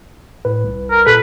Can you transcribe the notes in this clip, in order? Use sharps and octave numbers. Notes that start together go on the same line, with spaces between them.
A2 B4
C2
A#4
A#2 A4 B4